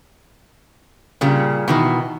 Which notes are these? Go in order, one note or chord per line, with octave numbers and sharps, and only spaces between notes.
A#2 C#3 G3
B2 D#3 E3